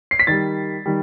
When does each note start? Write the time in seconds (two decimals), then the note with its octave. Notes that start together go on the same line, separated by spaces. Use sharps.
0.11 C7
0.19 B6
0.27 D#3 G3 A6
0.86 D#3 G3